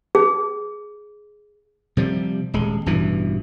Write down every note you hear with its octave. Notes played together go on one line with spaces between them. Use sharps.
G#4
C3 F3 G3
D#1 G#3
A1 G2 B2 E3